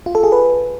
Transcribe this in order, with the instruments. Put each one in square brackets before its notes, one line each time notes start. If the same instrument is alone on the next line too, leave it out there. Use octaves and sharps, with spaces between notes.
[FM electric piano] F4
A4
G#4
B4